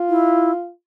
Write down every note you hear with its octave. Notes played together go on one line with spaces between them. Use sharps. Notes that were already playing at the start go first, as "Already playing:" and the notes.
Already playing: F4
E4